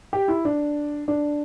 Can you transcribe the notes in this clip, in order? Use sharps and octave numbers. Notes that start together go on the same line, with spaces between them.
G4
E4
D4
D4